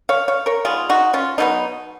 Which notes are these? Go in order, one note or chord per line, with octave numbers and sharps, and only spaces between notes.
C#5 F5
C#5 F5
A#4 C#5
D#3 G#3 B3 F4 G#4
D#4 F#4
C#4 F4
B2 F#3 B3 D#4